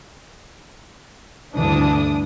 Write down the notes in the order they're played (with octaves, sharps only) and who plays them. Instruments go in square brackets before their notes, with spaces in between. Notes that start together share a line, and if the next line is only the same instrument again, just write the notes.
[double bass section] D2 G2 E3 [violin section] D4 D#6